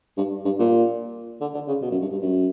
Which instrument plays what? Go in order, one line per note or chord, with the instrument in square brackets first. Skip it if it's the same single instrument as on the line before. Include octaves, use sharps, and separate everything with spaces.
[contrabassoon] G2
G2
A#2
D3
D3
C#3
B2
F#2
G2
G2
F#2